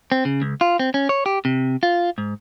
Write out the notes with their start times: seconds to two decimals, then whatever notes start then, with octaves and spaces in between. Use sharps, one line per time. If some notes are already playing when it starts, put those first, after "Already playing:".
0.12 C4
0.25 C#3
0.42 C#2
0.61 F4
0.79 C4
0.94 C#4
1.09 C#5
1.26 G4
1.45 C3
1.83 F4
2.18 G#2